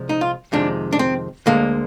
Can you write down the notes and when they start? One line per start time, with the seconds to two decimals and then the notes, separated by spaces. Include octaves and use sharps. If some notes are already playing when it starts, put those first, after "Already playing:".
Already playing: C2 C3 F3 G#3
0.09 D#4
0.21 F4
0.52 F2 C3 D#3 G#3 D4
0.93 D4
0.99 C4
1.46 D2 D3 G#3 A#3